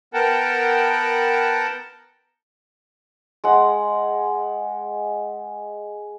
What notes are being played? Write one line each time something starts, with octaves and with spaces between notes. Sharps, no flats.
B3 A#4 F#5 G5 A5
G#3 F#5